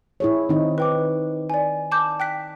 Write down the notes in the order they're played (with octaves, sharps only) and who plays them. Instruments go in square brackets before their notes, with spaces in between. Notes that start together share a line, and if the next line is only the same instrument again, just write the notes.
[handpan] E4 G#4 C#5
D#3 C4 D#4
[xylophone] B4 G5 D6
D5 G#5
A5 D6 G6
G5 F#6 B6